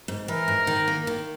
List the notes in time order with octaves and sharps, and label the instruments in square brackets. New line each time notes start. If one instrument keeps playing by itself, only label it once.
[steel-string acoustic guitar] G#2
[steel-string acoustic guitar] E3 [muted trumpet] A#4
[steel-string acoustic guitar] G#2
D#3
A#3
D#3